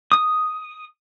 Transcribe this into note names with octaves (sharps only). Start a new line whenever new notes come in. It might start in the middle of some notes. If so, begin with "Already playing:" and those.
D#6